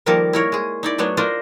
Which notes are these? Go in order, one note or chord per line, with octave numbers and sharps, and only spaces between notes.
D#3 F3 G3 A#3 A4 A#4
E4 A#4 C#5
G#3 G#4
D#4 E4 D5
F#3 A3 B3 D4 C#5
D4 F4 A#4 C5 D#5